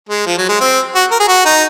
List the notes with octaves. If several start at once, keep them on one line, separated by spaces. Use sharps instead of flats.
G#3
F3
F#3
G#3
C4
F#4
A#4
G#4
F#4
D#4